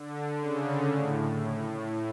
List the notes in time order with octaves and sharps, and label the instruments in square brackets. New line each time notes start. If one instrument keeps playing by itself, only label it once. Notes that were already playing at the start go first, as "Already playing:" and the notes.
Already playing: [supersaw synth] D3
C#3
A2